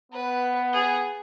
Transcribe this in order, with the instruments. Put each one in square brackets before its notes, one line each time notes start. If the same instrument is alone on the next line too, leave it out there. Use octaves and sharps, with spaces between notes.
[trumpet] B3 [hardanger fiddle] B4
[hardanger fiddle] G#4